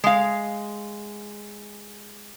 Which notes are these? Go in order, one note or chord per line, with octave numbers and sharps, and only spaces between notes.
G#3 F5